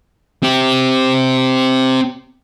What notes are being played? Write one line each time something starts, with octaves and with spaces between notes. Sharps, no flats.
C4 G4